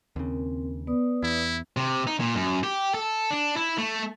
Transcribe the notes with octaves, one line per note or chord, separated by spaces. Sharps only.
D#2 C#3 C4 A#4
B3 B4 D5 D#6
E2 E4
C3
D#4
A#2
F#2
G4
A4
D4
E4
A3